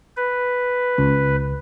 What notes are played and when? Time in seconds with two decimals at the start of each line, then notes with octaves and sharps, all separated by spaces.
0.17 B4
0.98 C#2